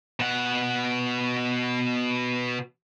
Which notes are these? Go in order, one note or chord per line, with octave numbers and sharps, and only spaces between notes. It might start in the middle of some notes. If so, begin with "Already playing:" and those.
B2 F#5